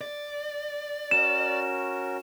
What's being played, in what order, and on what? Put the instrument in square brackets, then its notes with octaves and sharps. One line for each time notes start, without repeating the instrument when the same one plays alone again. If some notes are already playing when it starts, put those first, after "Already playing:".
[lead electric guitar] D5
[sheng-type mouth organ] C#4 F#4 A#4 [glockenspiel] E7